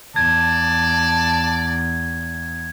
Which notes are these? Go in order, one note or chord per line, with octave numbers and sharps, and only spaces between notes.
E2 D5 A5 G#6